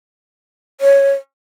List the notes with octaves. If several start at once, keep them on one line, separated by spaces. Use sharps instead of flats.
C#5